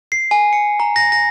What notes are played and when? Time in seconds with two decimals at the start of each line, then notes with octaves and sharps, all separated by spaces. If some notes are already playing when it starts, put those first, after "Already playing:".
0.12 C7
0.31 G#5
0.53 C#7
0.80 A#5
0.96 A#6
1.12 A#6